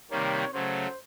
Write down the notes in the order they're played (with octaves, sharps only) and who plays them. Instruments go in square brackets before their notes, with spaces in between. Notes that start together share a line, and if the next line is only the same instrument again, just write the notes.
[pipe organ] C3 D#3 G3 A#3 [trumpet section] C#5
[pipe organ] C#3 F#3 A3 [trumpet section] C5